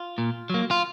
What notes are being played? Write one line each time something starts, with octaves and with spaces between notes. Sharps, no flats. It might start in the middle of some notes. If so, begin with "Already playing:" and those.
Already playing: F4
A#2
F#3 A#3
F4